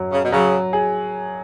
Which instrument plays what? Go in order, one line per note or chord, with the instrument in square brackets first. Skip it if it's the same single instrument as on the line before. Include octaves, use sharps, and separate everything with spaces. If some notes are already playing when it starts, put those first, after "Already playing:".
Already playing: [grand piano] F#2 F#3
[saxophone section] C#3
B2
[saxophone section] C#3 [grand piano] F#3
[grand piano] G#4